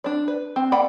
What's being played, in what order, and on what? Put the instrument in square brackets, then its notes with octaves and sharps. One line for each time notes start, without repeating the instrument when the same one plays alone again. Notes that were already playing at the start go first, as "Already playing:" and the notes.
[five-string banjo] D4 D5
B4
C4
A#3 D5 F#5 G5 B5